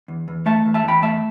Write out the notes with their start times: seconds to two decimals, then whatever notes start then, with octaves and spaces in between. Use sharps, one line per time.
0.08 E2
0.28 E2
0.46 A3 E5 A5
0.66 E2
0.74 E5 A5
0.84 E2 G5 B5
1.02 A3 E5 A5